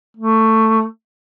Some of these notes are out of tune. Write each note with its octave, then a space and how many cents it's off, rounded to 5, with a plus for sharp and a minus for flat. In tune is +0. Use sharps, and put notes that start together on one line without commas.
A3 +15